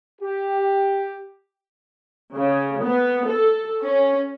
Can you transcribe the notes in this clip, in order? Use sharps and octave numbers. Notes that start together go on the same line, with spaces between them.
G4
C#3
B3
A4
C#4